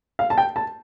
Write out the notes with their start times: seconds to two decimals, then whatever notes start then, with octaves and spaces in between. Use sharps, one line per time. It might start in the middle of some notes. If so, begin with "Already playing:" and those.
0.19 F5
0.30 A5
0.38 G5
0.56 A5